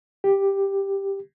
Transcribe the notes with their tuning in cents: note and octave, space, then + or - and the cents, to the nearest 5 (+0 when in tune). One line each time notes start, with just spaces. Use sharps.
G4 +5